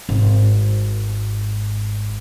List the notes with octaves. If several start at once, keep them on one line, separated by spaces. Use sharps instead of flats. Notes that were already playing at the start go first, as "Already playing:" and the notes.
G#1 G#2